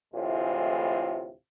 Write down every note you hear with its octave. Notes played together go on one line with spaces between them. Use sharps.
D2 A2 C3 E3 G#3 F4